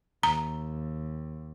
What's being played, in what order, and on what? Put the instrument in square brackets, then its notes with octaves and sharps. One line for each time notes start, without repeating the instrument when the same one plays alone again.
[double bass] D#2 [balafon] A#5